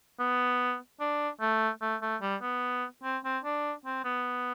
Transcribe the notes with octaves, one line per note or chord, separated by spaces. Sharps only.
B3
D4
A3
A3
A3
G3
B3
C4
C4
D4
C4
B3